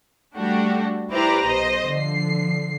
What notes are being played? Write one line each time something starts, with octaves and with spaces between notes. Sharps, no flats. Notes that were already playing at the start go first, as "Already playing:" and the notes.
G3 A3 D4 F#4 G4
E4 G4 B4 C5 D5 A#5
B1 C5 D#5
D3 F3 C7